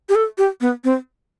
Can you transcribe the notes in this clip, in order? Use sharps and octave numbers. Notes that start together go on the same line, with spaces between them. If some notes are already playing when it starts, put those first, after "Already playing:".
G4
A4
G4
B3
C4